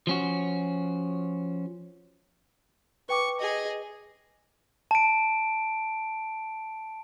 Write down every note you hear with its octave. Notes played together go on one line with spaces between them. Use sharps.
F3 C#4 F#4
B4 G5 C#6 D6
G#4 D#5
A5 D7